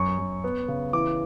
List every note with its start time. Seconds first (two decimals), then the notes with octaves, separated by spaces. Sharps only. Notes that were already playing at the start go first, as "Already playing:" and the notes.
Already playing: F#2 C#6
0.19 F#2
0.44 B3
0.68 C#3
0.93 E3 D6